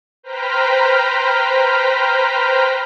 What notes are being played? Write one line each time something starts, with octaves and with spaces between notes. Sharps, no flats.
B4 C5 G5 A#5 F6 B6